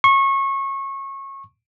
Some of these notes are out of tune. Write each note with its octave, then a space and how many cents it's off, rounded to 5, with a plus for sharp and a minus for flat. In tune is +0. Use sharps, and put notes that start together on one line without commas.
C#6 -25